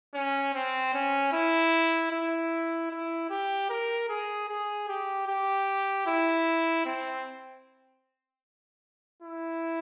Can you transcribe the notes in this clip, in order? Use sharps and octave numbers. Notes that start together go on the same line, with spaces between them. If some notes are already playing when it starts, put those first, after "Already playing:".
C#4
C4
C#4
E4
E4
E4
G4
A#4
G#4
G#4
G4
G4
E4
C4
E4